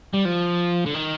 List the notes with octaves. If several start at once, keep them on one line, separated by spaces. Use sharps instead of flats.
G3
F3
D3
D#3